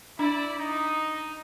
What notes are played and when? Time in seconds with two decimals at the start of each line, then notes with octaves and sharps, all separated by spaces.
0.19 D4 E4 D5
0.59 D#4